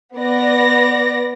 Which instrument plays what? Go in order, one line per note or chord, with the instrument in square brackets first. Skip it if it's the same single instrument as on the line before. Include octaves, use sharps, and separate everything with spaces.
[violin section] B3 D5 A#6